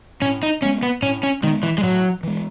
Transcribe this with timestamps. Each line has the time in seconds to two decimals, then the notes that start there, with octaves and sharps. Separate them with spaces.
0.22 A2 C#4
0.43 D#4
0.62 G#3 B3 C#4
0.83 B3
1.02 A2 C#4
1.23 C#4
1.43 D#3 G#3 B3
1.63 E3
1.78 G#3
1.83 A2 F#3
2.23 E3 G#3